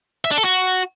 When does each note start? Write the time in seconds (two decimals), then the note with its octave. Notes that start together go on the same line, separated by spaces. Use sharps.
0.25 E5
0.31 D4
0.38 A4
0.44 F#4